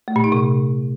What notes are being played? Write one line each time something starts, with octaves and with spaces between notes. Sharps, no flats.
A3
A#2
D#4
C3